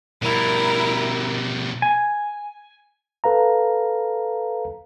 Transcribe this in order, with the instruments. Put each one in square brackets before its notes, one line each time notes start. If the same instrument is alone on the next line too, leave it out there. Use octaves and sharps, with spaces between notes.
[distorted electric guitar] B2 G3 [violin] E4 A#4
[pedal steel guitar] G#5
[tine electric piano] A4 B4 F5 A#5